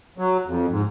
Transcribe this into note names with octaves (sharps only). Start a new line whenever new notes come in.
F#3
F2
G#2